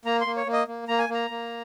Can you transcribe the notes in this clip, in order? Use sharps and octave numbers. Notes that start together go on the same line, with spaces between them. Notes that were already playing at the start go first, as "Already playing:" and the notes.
A#3 A#5
C6
A#3
C#5
A#3
D#5
A#3
A#3 A#5
G#5
A#3
A#5
A#3